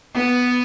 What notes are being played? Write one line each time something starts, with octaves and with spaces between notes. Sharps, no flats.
B3